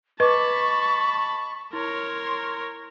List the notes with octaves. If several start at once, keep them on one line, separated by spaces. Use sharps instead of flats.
B4 D#5 A5 B5 C#6 D6
E4 A#4 C#5 C6